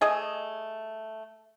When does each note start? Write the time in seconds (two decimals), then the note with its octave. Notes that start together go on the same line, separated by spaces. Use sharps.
0.01 A3 G#4 D#5